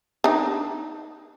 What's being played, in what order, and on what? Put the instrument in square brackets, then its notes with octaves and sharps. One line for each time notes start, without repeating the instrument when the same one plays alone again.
[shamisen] D4 D#4